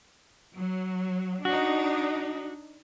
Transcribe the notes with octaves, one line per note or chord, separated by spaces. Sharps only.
F#3
D4 D#4 F#4